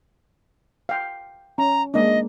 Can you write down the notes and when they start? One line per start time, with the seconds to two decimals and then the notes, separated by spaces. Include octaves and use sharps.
0.89 F5 G5
1.58 C#4 A#5
1.94 G#3 A#3 D4 D#5